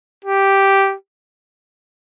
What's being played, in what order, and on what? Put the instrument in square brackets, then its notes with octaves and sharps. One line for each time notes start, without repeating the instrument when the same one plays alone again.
[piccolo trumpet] G4